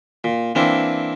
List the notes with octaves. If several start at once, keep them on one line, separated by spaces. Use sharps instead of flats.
A#2
E3 A#3 C4 D4 E4